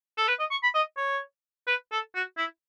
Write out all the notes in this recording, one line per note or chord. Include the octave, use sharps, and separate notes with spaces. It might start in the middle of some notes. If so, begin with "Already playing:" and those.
A4
B4
D#5
C#6
B5
D#5
C#5
B4
A4
F#4
E4